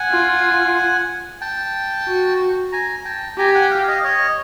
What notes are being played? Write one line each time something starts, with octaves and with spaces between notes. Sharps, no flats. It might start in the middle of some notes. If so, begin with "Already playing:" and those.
Already playing: F#5 G#5
F4
G5 A5
F#4
G#5 A#5
G5 A5
G4 G#5 A#5
F#5 G#5
F5 G5
D#5 F5
C#5 D#5